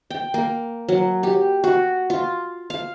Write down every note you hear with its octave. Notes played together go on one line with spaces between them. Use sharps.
G5
A#3
F#3
G4
F#4
F4
F5